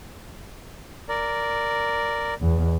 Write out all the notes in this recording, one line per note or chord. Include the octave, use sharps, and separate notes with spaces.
A#4 D5
E2